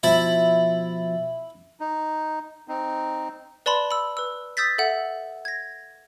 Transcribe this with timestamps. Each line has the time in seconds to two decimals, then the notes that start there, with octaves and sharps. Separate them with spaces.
0.03 B2 F3 E4 A6
1.80 D#4
2.68 C4 D#4
3.66 B4 D5 A5 B5 C6
3.91 B5 E6
4.17 B4 E6
4.57 D#6 E6 G6 A6 B6
4.78 A4 E5 F#5
5.45 G#6 A#6